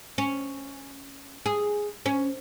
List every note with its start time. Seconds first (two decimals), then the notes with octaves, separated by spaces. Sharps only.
0.18 C#4
1.46 G#4
2.06 C#4